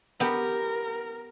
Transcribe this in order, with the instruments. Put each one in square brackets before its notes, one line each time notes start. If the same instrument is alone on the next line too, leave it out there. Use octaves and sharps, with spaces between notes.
[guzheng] B3 G4 [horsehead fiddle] A#4